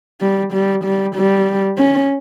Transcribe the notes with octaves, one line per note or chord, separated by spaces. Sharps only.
G3
G3
G3
G3
C#4